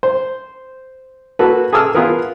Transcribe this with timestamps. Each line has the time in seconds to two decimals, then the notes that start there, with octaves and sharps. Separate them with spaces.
0.03 C5
1.39 A#3 F#4 A4 B4
1.73 G#4 A4 D6 E6 F6
1.95 B3 E4 F4 G#4 A#4 B4